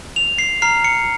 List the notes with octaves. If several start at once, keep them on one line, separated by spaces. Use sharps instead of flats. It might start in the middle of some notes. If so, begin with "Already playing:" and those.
F7
C7
A#5 F6 C7
C#7